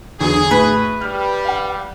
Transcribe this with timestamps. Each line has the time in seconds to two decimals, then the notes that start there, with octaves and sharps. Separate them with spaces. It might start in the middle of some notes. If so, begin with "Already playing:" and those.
0.21 E2 D3 F#3 G#4
0.51 A2 B4
1.01 G3 F6
1.45 F5 F#5